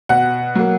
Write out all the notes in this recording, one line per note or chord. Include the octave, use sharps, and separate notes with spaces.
B2 F#5
F#3 A#3